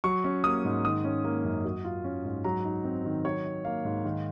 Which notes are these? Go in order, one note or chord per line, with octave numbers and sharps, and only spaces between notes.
F#3 C#6
C#4
A#3 D#6
G#2
D#3 D#6
C#4
A#3
F#2
F#3
F4
C#4
G#2
F#3 A#5
D#4
C4
D#3
F#3 C#5
D#4
A#3 F5
G#2
D#3